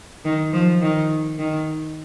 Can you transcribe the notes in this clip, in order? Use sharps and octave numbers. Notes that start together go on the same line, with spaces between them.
D#3
F3
D#3
D#3